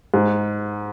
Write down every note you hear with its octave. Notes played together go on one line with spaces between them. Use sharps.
G#2